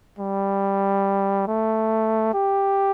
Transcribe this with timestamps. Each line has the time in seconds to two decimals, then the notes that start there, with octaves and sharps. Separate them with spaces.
0.19 G3
1.47 A3
2.34 G4